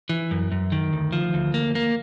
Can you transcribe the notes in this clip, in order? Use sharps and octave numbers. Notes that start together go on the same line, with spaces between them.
E3
F#2
F#2
D#3
D2
F3
D2
A#3
A#3